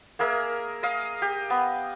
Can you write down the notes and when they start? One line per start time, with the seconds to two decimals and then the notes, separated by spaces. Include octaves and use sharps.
0.19 A#3 G#4 A#4 E5
0.83 D#5 F5
1.22 G4
1.50 B3